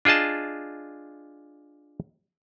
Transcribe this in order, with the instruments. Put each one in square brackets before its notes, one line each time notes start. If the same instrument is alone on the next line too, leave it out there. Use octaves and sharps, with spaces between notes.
[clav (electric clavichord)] D4 F4 G#4 D#5 A5